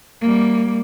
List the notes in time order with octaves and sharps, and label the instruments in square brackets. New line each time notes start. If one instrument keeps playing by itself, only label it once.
[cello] G3 A#3